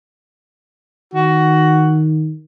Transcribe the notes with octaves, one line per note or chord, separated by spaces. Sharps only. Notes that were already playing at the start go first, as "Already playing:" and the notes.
D#3 F#4